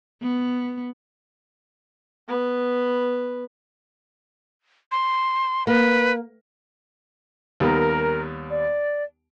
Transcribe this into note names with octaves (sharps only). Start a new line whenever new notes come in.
B3
B3 B4
C6
A#3 B4
D#2 G3 B3 A#4
D5